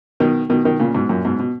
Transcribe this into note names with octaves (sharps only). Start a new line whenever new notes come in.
B2 D#3
B2 D#3
B2 D#3
A#2 C#3
G#2 B2
F#2 A#2
G#2 B2
B2